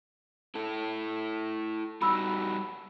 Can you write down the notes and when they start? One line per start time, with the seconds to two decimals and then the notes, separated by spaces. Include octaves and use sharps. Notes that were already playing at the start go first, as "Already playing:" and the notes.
0.55 E4 A4
2.02 G3 D#4 F#4 B5 E6